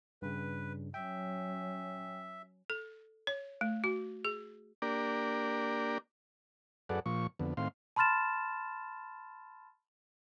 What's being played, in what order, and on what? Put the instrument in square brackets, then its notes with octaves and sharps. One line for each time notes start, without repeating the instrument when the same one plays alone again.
[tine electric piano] G2 C#3 [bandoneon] B4
[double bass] F#3 C#4 [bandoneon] E5 [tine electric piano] G5
[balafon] A4
C#5
A3
F#4
G#4
[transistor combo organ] A#3 D4 G4 A#4 D5
F#2 G#4 A4 B4 D5 F#5
A#2 F3 C#6
F2 D3 B3
A2 D#3 C4 F5 C6
[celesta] A5 B5 C6 F6 A6 E7